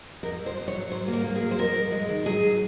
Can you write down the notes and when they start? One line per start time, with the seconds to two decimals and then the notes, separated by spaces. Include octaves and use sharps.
0.23 F2 A#4
0.40 F2
0.46 C5
0.57 F2
0.68 C#5
0.74 F#3
0.90 F#3 C5
1.08 A#3
1.13 A#4
1.24 A#3
1.36 G#4
1.41 F#3
1.51 C5
1.58 F2 A#4
1.76 F2
1.92 G#3
2.08 D#3
2.26 F#3 G#4
2.43 F#3